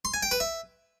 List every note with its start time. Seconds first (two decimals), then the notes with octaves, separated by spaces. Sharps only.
0.05 C6
0.14 G#5
0.23 G5
0.31 B4
0.40 E5